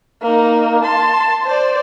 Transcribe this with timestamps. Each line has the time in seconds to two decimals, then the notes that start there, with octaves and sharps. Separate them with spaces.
0.22 A#3 D#4
0.83 A5 C6
1.45 C5 D5